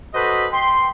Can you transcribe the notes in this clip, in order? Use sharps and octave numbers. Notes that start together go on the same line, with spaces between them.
F#4 A4 B4 C5 D#5
G5 C6